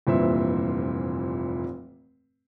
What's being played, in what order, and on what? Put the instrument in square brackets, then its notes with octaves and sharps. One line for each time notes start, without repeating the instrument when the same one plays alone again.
[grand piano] F1 G2 A#2 E3 C5 E5